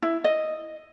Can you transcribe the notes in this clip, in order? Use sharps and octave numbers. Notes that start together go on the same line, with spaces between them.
E4
D#5